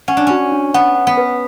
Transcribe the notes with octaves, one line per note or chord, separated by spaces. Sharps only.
C#4 F#5
D4
C#4 F#4
D4
B3 F#5
F#5
B3
B4